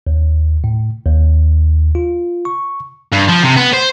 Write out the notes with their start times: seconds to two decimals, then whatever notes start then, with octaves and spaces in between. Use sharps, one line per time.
0.07 D#2
0.64 A2
1.06 D#2
1.95 F4
2.45 C#6
3.13 G2
3.29 F3
3.43 C3
3.57 B3
3.74 C5